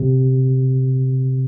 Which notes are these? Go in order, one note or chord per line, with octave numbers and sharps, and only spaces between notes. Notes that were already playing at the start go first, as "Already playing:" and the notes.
Already playing: C3